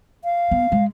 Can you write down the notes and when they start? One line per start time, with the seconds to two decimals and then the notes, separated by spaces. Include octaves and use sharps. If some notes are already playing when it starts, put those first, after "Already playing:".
0.24 F5
0.51 B3
0.72 G#3